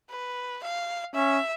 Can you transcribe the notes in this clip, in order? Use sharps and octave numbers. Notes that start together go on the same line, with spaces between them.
B4
F5
C#4 E5